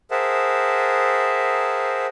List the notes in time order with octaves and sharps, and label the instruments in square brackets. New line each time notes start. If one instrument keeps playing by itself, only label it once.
[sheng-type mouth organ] G#4 A#4 C5 E5 F#5 A5